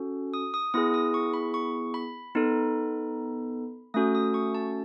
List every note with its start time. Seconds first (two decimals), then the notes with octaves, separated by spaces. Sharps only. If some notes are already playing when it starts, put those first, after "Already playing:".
Already playing: C#4 F#4 A4
0.34 D#6
0.54 D#6
0.74 B3 E4 G#4 D#6
0.94 D#6
1.14 C#6
1.34 B5
1.54 C#6
1.94 B5
2.35 B3 D#4 A4
3.94 A3 C#4 F#4 A4 D#6
4.15 D#6
4.34 C#6
4.55 A5